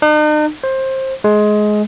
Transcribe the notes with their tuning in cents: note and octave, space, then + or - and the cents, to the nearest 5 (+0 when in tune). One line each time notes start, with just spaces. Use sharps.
D#4 -45
C5 +20
G#3 +20